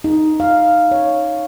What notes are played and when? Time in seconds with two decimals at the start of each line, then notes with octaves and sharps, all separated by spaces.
0.04 D#4
0.40 F5
0.91 C#5